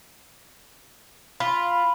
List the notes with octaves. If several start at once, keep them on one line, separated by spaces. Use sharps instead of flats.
F4 B5